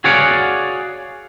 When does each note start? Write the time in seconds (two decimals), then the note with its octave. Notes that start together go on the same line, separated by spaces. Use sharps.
0.04 F#4 G#4 C#5 D5 F5 F#5